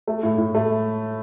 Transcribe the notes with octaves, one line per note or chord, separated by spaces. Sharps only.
A3
A2
A2
A3